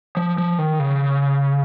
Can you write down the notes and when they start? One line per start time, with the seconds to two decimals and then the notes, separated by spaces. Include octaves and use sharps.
0.17 F3
0.38 F3
0.58 D#3
0.79 C#3